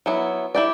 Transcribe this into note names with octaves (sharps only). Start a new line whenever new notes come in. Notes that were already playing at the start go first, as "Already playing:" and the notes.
F#3 B3 E4
E4 G4 D5